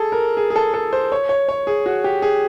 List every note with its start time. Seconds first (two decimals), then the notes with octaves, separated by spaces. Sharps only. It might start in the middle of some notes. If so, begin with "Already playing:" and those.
Already playing: G#4 A4
0.12 A#4
0.37 G#4
0.50 G#4
0.56 A4
0.74 A4
0.93 C5
1.12 C#5
1.29 C#5
1.48 C#5
1.67 G#4
1.86 F#4
2.04 G4
2.22 G#4